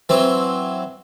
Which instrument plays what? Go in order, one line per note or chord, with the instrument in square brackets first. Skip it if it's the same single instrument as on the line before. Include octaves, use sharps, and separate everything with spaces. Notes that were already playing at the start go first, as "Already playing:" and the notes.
[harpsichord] E3 F#3 C4